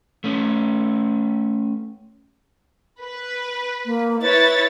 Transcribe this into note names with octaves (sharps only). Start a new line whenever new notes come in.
A3 C#4
B4
A#3
E4 B4 C#5 A6